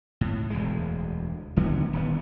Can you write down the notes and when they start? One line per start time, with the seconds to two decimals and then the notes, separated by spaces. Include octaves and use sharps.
0.21 A2
0.50 E1 D2 G#3
1.56 G#1 D3 F#3 B3
1.93 D#1 D#2 B3